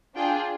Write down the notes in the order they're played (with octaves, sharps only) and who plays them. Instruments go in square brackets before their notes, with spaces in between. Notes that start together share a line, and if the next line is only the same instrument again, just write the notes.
[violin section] D4 F4 G#4 G5